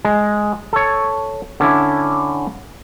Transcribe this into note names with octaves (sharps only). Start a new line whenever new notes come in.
G#3
A4 C#5
D3 C#4 D4 E4